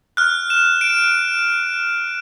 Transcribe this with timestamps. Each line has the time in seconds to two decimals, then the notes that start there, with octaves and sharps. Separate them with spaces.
0.17 F6 F#6
0.50 E7
0.81 D7